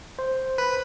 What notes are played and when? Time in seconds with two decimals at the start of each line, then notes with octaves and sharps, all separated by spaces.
0.19 C5
0.58 B4